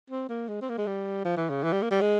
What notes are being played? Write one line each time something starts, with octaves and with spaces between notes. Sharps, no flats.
C4
A#3
G#3
C4
A#3
G#3
G3
F3
E3
C#3
E3
G3
A#3
G3
G#3